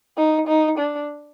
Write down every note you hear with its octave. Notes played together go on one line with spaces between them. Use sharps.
D#4
D#4
D4